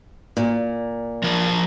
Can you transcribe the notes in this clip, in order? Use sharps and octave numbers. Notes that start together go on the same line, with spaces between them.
A#2
F3 A#4 D5